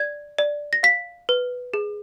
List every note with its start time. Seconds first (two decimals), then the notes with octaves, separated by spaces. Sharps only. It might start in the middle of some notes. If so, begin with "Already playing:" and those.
Already playing: D5 G#6
0.38 D5
0.73 A#6
0.83 F5 B6
1.29 B4
1.74 G#4